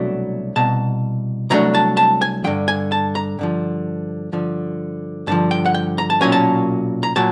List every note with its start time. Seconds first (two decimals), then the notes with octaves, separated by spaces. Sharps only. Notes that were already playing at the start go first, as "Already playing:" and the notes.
Already playing: C2 B2 F#3 A3 D4
0.56 C2 B2 A5
1.50 C2 B2 F#3 A3 D4 A#5
1.75 A5
1.97 A5
2.22 G#5
2.44 G2 D3 F3 G5
2.68 G#5
2.92 A5
3.15 A#5
3.39 G2 D3 F3
4.32 G2 D3 F3
5.27 G2 D3 F3 A5
5.51 G5
5.66 F#5
5.74 G5
5.98 A#5
6.10 A5
6.21 B1 A#2 F#3 A#3 C#4 G#5
6.32 A5
7.03 A#5
7.16 A#2 F#3 A5